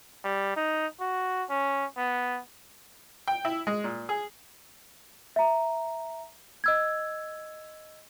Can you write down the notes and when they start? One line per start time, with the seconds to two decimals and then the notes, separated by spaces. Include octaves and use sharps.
0.25 G3
0.57 D#4
1.01 F#4
1.50 C#4
1.98 B3
3.28 G5
3.45 E4
3.67 G#3
3.84 A#2
4.09 G#4
5.36 E5 A#5
6.64 D#5 E6 G#6